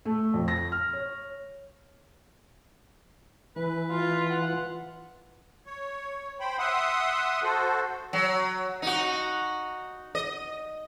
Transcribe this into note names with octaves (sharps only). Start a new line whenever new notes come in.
A3
F2
A#6
F6
C#5
E3 B4
F4
F#5
C#5
C5 G5 B5
E5 F#5 C6 D#6
F#4 A4 C5
F#3
D#4 F#4
D#5